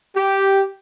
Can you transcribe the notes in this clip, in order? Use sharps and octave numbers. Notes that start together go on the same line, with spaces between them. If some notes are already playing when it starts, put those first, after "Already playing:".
G4